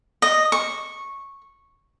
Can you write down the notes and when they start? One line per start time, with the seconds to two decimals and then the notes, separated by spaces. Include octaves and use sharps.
0.22 D#5
0.52 C#6